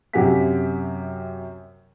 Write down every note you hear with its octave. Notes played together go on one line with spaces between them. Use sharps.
F#2 C3 G4 F#5 G#5 B6